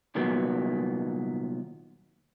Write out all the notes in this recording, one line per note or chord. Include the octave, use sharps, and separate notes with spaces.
C2 A#2 D#3 F#3 B3